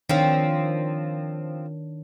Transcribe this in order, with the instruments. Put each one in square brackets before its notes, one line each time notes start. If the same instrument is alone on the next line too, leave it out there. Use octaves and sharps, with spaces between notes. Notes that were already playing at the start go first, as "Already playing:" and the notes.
[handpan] D#3 D4 C#5 [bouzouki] F3 C4